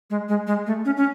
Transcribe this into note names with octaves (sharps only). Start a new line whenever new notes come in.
G#3
G#3
G#3
A3
C#4
C#4